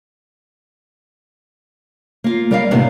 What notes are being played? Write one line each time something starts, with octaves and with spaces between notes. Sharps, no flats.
A#3 F4
G3 A#4 D5 D#5 F5
A2 C3 D#3 A#3 B3